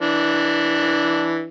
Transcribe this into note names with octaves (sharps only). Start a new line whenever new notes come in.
E3 D4